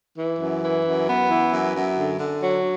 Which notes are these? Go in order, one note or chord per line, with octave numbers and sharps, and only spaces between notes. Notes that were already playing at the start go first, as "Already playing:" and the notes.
E3
F#2
E3
F#2
B3
E3
F#2
F#2
D3
D3
F#3